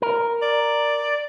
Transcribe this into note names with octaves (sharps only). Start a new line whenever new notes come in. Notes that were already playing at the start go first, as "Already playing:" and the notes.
A#4
D5